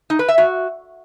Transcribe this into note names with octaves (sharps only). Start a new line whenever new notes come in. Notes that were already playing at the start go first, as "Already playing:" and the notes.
D#4
B4
E5
F#4